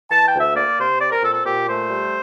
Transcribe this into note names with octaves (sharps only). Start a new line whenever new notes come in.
E3 A5
G5
D2
E5
A#3 D5
C3 C5
C4 D5
A#4
A#2 A4
A4
A#2 G4
A3 C5
G3